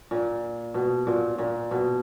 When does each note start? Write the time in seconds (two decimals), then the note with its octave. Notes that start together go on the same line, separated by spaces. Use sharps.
0.11 A#2
0.74 B2
1.07 A#2
1.38 A#2
1.71 B2